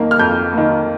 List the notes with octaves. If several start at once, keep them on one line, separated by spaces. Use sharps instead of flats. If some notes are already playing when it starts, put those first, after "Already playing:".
Already playing: F2 D#3 A#3
F6
F2 G6
D#3 A#3